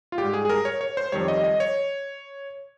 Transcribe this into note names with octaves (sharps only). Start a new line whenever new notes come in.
F4
G#2 G3 G4
G#4
G#4
A#4
C#5
C#5
C5
F2 D#3 G3 C#5
D#5
D#5
C#5